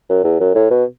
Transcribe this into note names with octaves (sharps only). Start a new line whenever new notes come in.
F#2
E2
F#2
A2
B2